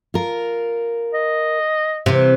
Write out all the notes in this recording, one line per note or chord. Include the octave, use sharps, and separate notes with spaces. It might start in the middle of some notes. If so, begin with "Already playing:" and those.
F4 A#4
D#5
C3 E3